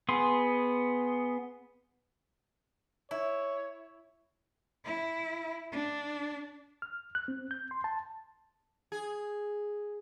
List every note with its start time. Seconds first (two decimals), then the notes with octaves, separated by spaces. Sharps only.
0.09 B3 G#4 C6
3.11 E4 C#5
4.85 E4
5.72 D4
6.82 F6
7.15 F#6
7.28 C4
7.51 G6
7.71 C6
7.84 A5
8.92 G#4